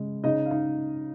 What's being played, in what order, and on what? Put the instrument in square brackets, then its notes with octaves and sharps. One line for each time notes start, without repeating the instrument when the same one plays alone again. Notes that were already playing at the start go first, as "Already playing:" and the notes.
Already playing: [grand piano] C#3 G#3
C#3 D#4 D#5
F5
D#4 D#5